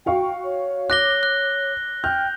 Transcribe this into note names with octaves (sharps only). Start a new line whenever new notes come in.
F#4 F5 G5 C#6
C#5
D6 F#6 A#6 G7
F#6
G5 F6 G6